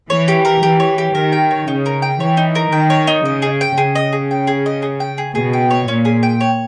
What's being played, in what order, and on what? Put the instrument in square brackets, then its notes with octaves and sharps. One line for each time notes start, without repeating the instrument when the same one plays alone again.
[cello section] E3 [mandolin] C#5
[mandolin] G4
A#4
[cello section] E3 [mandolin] G4
[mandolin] C#5
G4
[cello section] D#3 [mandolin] A#4
[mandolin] G5
C#5
[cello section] C#3 [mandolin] D#4
[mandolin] A#4
G5
[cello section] E3 [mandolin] C#5
[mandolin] D#4
A#4
[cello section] D#3 [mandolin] G5
[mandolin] C#5
D#4
[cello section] C#3 [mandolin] D#5
[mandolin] G#4
G5
[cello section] C#3 [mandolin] G#4
[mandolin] D#5
G#4
G5
G#4
D#5
G#4
G5
G#4
[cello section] B2 [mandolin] G#4
[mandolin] G5
C#5
[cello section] A#2 [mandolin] C#4
[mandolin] G#4
G5
C#5